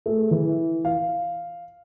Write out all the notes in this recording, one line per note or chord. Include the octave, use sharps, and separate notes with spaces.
A3 G#4
E3
F5